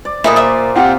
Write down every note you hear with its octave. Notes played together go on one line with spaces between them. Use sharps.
D5
A#2 A#3 E4 A4 C5 D#5
E5 D#6
C4 F4 G4 F#5